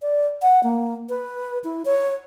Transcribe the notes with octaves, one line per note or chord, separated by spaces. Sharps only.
D5
F#5
A#3
B4
E4
C#5